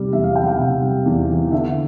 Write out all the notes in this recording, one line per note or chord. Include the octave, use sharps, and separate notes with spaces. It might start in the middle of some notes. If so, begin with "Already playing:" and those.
Already playing: C3 G3
E2 E5
F5
E3 G5
F#5
G5
C3 F5
G3
E2
E3
D3 E5